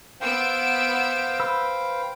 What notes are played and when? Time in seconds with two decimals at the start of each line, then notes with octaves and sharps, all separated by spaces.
0.21 B3 C5 F5 G5 E6 D7
1.40 B4 E6